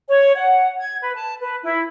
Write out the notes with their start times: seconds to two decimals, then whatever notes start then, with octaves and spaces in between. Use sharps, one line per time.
0.07 C#5
0.36 F#5
0.80 G#6
1.02 B4
1.15 A5
1.42 B4
1.63 E4